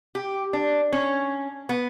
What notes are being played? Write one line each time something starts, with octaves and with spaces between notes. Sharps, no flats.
G4
D4
C#4
B3